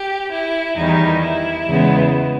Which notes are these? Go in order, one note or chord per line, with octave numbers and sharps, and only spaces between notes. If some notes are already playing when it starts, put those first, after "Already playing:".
Already playing: G4
E4
E2 D#3 G3 D#4
E4
E2 C#3 G#3 B3